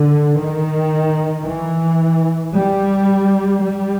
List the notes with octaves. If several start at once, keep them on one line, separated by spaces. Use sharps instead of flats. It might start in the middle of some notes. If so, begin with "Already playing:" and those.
Already playing: D3
D#3
E3
G3
G3